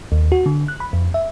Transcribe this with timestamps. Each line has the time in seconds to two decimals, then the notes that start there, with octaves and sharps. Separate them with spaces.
0.12 D#2
0.32 F#4
0.46 D3
0.68 F#6
0.80 B5
0.93 F2
1.14 E5